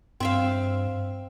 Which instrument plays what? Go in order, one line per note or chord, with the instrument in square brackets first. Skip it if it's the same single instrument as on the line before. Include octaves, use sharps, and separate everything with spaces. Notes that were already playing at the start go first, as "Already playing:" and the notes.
[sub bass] G2 [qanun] C4 E5 F5